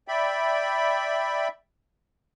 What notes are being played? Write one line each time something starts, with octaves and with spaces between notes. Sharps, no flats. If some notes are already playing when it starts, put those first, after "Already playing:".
D5 E5 G5 B5